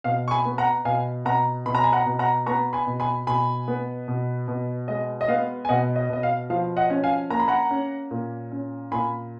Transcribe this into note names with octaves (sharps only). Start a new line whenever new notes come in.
B2 F5
C#6
G#5 B5
B3
F#5 A#5
B2 F5 G#5
B2 F#5 A#5
B2 B5
A#5
G#5 B5
F#5 A#5
B2
F#5 A#5
B3 A#5 C#6
G#5 B5
B2
G#5 B5
B2 G#5 B5
B3
B2
B2
G#3 D#5
D#5
B3 F5
G#5
B2 D#5 F#5
D#5
B2 D#5
F5
F3 F5
D#5 F#5
C#4
F5 G#5
A#3 A#5
B5
F#5 A#5
C#4
A#2
C#4
A#2 G#5 B5